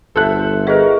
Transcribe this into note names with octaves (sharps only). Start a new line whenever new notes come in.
G1 A4 C5 E5 F#5 F#6
F#4 G#4 A#4 B4 D#5